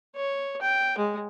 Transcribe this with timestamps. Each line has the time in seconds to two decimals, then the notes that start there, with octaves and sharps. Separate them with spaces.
0.16 C#5
0.61 G5
0.98 G#3